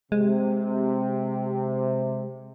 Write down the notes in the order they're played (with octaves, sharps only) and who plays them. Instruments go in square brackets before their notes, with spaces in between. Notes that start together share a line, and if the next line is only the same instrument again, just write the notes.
[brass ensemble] C3 [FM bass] G#3